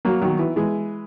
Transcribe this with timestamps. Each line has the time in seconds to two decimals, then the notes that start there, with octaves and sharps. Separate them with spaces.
0.05 F#3 A#3
0.22 D#3 F#3
0.39 E3
0.56 E3 G#3